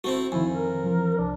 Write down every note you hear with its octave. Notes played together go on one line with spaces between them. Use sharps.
A3 C4 E4 F#4
F2 D#3 E4 G#5
A#4
E3 F3
C2 D4 D5